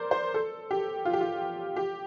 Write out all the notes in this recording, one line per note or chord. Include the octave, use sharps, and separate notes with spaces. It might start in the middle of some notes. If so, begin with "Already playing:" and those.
Already playing: A#4 C5 D5
C5
A4
G4
F4
G4
F4
G4